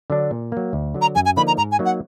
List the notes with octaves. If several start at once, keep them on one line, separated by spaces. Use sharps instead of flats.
D3 F#3 D4
A#2
F#3 A#3
D2
D3 F#3
A#5
F#2 G#5
G#5
D3 F3 A#3 D#4 B5
A#5
G#2 A#5
G#5
F#3 A#3 D#4 F#4
F#5